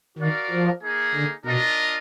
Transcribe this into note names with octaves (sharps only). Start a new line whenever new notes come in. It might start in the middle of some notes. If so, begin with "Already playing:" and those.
D#3 F#4 A#4 D5 F5
F3
A#3 D#4 G#4
D3
B2 D4 F4 A#4 D#5